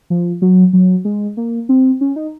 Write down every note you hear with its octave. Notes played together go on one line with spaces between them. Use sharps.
F3
F#3
F#3
G#3
A#3
C4
C#4
D#4